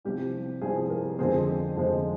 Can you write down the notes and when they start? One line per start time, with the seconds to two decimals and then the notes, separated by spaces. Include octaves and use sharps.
0.05 C2 C3 F3 G4
0.61 C2 C3 F3 G#4
0.90 G4 A#4
1.18 F2 D3 F3 G#3 C4 G#4 C5
1.76 F2 D3 F3 G#3 C4